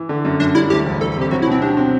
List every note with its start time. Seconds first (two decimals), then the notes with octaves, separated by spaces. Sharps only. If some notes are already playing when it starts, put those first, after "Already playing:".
Already playing: E3
0.09 D3
0.25 F#2
0.40 F#2 D4
0.55 G3 E4
0.70 D2 G4
0.86 E1
1.01 E1 A4
1.12 A4
1.16 C3
1.21 G4
1.31 F#3 F#4
1.42 E4
1.47 B2 C4
1.62 D4 G4
1.77 C4